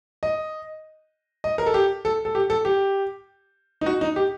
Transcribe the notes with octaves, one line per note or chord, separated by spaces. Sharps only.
D#5
D#5
A#4
A4
G4
A4
A4
G4
A4
G4
D#4
F#4
D#4
G4